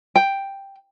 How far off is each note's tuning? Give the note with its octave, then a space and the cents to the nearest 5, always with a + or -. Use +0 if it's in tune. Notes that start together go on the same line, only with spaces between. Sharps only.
G5 +5